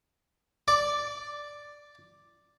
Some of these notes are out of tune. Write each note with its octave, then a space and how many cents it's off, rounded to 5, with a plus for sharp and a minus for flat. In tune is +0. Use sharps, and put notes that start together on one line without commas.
D5 +0 D6 -25